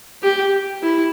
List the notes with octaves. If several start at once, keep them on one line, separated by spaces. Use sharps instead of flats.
G4
E4